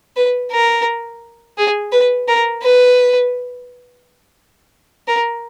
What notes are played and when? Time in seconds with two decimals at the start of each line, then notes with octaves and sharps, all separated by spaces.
0.17 B4
0.52 A#4
1.58 G#4
1.92 B4
2.28 A#4
2.63 B4
5.08 A#4